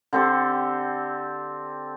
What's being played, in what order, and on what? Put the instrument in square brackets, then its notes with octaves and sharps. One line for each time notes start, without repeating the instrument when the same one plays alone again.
[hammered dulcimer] D3 C4 G4 A4